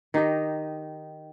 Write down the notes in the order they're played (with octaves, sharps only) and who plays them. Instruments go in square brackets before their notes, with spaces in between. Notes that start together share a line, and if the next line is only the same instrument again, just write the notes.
[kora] D#3 D#4 G4 D#5